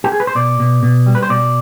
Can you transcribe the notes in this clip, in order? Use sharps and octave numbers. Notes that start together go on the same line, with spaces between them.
G4
G#4
B4
C5
B2 D5
B2
B2
G3
B4
C5
B2 D5